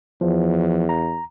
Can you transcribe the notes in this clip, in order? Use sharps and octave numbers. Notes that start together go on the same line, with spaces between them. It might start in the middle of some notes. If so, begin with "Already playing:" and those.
E2 F3
A#5